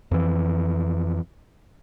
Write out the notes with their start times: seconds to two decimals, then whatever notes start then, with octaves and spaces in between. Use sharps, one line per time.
0.11 F2 E3